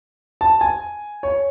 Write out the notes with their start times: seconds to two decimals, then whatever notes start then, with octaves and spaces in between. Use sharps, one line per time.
0.41 A5
0.61 G#5
1.23 C#5